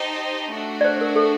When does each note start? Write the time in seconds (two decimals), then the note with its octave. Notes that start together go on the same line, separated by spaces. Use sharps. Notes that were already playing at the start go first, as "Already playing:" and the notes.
Already playing: D#4 G4 C5 D#5 A5
0.54 A3 D4 F#4
0.81 D5
0.85 C5
0.97 C5
1.01 A#4
1.16 A4